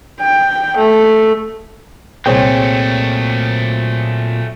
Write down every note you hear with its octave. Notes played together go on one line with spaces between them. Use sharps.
G5
A3
C2 A#2 F#3 A3 C4 G#4 C#5 G5